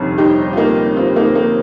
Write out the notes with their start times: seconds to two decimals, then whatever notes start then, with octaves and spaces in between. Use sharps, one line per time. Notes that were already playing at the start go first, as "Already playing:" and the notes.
Already playing: G1 F2 C3 D#3
0.18 D#4 G4
0.53 F4
0.57 A#3 D#4
0.96 C4 F4
1.16 A#3 D#4
1.35 A#3